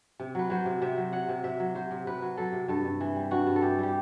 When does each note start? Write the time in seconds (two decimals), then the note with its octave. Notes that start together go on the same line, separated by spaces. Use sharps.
0.19 C3
0.35 F#3 B4
0.50 F#3 C5
0.65 C3
0.82 C3 E5
0.97 F#3
1.13 F#3 F#5
1.29 C3
1.44 C3 E5
1.60 F#3
1.75 F#3 C5
1.91 C3
2.07 C3 B4
2.22 F#3
2.37 F#3 A4
2.53 C3
2.68 G2 A4
2.85 G2
3.01 E3
3.16 G3
3.31 G2 F#4
3.46 G2
3.56 A4
3.62 E3 G4
3.79 G3 G4